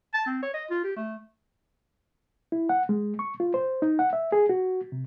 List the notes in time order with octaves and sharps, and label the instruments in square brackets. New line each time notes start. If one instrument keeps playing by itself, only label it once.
[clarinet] A5
C4
C#5
D#5
F4
G4
A3
[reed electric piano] E4
F#5
G#3
C#6
F4
C5
D#4
F#5
E5
G#4
F#4
C3